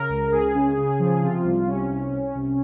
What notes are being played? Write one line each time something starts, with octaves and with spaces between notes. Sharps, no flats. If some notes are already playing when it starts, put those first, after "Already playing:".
Already playing: C#3 A#4
C#2
C#2 G#4
C#3
C#3
F3
C3 F4
C2
C3 C#4
C2
C2
C2